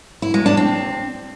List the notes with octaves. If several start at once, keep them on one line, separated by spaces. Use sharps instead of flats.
E4
G#3
D4
C4